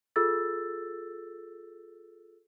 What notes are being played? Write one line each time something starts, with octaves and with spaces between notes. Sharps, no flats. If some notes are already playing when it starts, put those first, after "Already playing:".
F4 G#4 A4 E6 A6